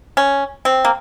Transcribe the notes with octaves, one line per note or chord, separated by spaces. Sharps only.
C#4
C4
A#3